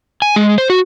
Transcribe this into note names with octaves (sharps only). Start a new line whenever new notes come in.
G#5
G#3
C5
F#4